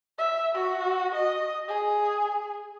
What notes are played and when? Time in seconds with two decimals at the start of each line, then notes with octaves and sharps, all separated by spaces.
0.19 E5
0.55 F#4
1.14 D#5
1.68 G#4